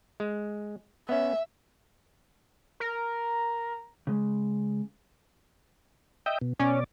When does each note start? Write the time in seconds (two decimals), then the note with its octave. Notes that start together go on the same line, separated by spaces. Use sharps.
0.20 G#3
1.09 B3 C#4 E5
2.80 A#4
4.07 C#3 G#3
6.26 D#5 E5 G5
6.41 B2
6.60 B2 C#4 D5